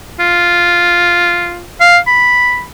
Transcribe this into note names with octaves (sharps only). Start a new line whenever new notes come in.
F4
F5
B5